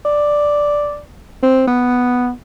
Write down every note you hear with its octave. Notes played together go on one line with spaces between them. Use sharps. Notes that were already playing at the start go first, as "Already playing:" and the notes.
D5
C4
B3